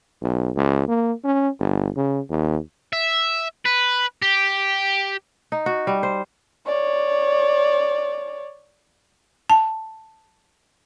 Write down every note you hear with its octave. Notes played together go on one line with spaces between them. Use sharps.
B1
C#2
A#3
C#4
G1
C#3
D#2
E5
B4
G4
D#4
F#4
G3
C5
C#5 D5
A5